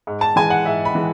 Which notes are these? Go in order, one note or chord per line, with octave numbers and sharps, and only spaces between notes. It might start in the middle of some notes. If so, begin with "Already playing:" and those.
G#2
A5
E3 G#3 G#5
F#5
G#2 E5
B5
E3 G#3